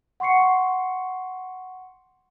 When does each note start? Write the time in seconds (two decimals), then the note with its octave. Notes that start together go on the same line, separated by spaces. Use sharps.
0.20 F#5 C6 C#6 C7 C#7